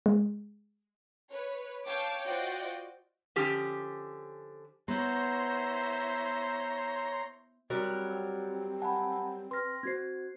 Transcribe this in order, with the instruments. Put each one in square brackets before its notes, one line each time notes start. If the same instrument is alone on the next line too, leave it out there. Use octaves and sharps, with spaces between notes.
[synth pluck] G#3
[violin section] B4 C#5
C#5 F5 G5 A5 D6
F4 F#4 C5 D5 D#5 G5
[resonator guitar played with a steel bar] D3 F3 C#4 G4
[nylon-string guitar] B3 [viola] E4 C5 [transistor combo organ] C#5 A#5 C6
[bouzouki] F#3 G3 A#4 [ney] C4 [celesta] F#4
[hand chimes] F#5 G#5 [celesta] A5 B5
[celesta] B4 F6 [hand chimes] C6 A#6
[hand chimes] C4 F#4 C5 [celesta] G#6 C7